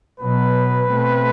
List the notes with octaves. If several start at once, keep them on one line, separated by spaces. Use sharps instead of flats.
B2 F#3 B3 B4
B2 A3 C4